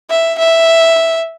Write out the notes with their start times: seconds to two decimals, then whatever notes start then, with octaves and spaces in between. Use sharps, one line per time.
0.10 E5
0.39 E5